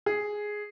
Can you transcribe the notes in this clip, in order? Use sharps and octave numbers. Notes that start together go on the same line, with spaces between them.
G#4